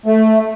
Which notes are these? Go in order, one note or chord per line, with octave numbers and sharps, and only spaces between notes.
A3